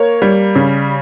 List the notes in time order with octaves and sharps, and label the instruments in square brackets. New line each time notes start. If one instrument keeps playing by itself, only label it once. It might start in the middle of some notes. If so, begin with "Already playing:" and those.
Already playing: [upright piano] A#3 C#5
G3
C#3